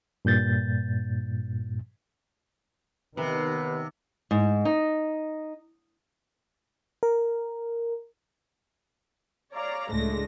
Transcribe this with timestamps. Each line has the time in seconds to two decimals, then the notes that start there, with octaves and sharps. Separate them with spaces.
0.25 G2 A#2 G6 A6
3.17 D#2 C3 D#3 B3 B4
4.31 G#2
4.65 D#4
7.03 A#4
9.54 C#5 D5 F5 A#5
9.90 C#2 A2 G#3 A3 D4 A#6